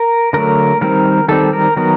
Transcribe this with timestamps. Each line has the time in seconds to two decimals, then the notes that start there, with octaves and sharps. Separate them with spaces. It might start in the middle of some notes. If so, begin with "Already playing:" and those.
Already playing: A#4
0.33 D3 F#3 A3 A#4
0.81 D#3 G3 C4 A#4
1.28 D#3 G3 C4 A4
1.53 A#4
1.76 D#3 F#3 B3 A#4